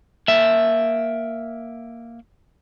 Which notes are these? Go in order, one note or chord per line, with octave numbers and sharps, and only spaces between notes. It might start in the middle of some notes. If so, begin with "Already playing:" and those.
A#3 E5